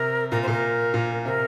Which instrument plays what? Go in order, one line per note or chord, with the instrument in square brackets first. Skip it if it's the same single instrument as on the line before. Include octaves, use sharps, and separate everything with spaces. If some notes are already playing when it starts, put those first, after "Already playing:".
Already playing: [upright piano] C3 [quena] A#4
[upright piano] A#2 [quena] A#4
[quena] C5
[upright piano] A#2 [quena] A4
[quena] A#4
[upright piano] A#2
[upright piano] C3 [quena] A#4